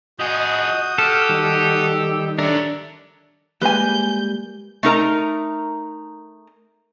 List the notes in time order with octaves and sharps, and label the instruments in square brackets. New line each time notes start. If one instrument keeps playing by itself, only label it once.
[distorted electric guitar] F3 G#4 [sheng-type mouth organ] F#4 D#6 G6 [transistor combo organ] D#5
[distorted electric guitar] G4 [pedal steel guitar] A4 [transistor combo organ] F6
[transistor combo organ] D#3 G3
[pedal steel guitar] D4 [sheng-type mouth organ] A4 D5 E5 [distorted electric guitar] A#4 C#5
[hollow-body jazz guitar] G3 G#3 A#3 [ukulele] B4 G#5 [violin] G6
[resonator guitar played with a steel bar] A3 D#4 A#4 A#5